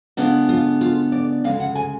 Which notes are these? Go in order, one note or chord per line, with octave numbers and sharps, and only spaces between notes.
C#3 G#3 B3 D4 F4
F4
F4
D5
D2 C#3 G#3 F5
F#5
G#5